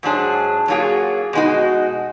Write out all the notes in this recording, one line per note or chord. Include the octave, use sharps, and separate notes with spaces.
G#2 F#3 D4 G#4
F#3 A#3 F4 G#4
B2 G#3 D#4 F#4